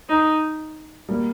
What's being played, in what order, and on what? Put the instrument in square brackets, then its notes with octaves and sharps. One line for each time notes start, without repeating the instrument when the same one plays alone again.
[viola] D#4
[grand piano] G3 A#3